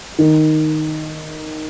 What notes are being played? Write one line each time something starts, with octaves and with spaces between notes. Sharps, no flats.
D#3